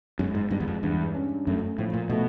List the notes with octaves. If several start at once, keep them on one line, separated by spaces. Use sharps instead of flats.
F#2 G#3
G#2
G2 G#3
E2
F2
E2 G2
C#4
F#2 A3
A2 F3
A#2
B2 A3